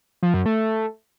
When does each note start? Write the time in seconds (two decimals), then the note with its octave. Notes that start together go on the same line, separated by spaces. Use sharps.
0.23 F3
0.34 F#2
0.46 A3